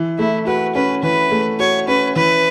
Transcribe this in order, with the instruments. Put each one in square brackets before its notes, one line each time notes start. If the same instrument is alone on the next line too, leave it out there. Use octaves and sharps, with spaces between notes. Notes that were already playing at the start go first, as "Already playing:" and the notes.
Already playing: [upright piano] E3
[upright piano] A3 [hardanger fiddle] E4
[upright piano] F#4 [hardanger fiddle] B4
[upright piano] C#4 [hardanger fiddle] B4
[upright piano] E3 [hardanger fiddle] B4
[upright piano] A3
[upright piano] F#4 [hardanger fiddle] C#5
[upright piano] C#4 [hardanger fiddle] B4
[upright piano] E3 [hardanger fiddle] B4